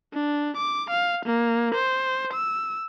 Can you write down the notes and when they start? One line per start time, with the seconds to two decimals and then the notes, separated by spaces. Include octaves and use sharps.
0.14 D4
0.57 D6
0.91 F5
1.26 A#3
1.75 C5
2.34 E6